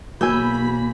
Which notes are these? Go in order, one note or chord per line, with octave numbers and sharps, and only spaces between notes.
B1 E2 F#3 A#3 G#5 B5 E6 G6